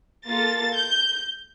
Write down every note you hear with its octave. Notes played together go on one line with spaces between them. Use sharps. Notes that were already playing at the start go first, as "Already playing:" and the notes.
A#3 F4 A4 A6
G6